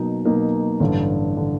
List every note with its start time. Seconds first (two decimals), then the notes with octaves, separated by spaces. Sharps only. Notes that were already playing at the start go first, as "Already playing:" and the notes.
Already playing: B2 F#3 A#3 D#4
0.25 B2 F#3 A#3 D#4
0.80 A1 G2 D3
1.37 D3